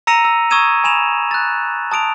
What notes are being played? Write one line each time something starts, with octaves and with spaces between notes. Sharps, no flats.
A#5 E6 A#6 C#7 D#7 F7
E6
C#6 D#6 E6 G#6 D#7 E7
G#5 B5 E7 F7
F#6 A6
A5 D#6 D7 F7